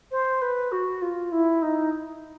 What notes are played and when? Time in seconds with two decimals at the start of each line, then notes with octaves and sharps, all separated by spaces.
0.11 C5
0.41 B4
0.71 F#4
1.01 F4
1.31 E4
1.62 D#4